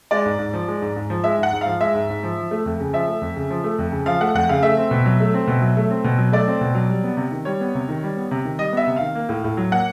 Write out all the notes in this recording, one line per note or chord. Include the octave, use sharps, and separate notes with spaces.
G#3 D5
G#2
G#2
F3
G#3
G#2
G#2
F3
G#3 E5
G#2
F#5
G#2
F5
F3
G#3 E5
G#2
G#2
F3
F3
A3
F2
C#3
F3 E5
A3
F2
C#3
F3
A3
F2
C#3
F3 F5
A3 F#5
F2 F#5
C#3 F5
A3 E5
C4
B2
F#3
A3
C4
B2
F#3
A3
C4
B2
F#3
A3 D5
C4
B2
F#3
G3
B3
C3
D#3
G3 C#5
B3
C3
D#3
G3
B3
C3
D#3
G3 D#5
B3 E5
C3
D#3 F5
A#3
A2
A2
F#3
A#3 F#5